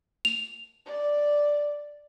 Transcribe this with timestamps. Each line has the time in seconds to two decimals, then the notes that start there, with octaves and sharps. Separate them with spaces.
0.25 F7
0.86 D5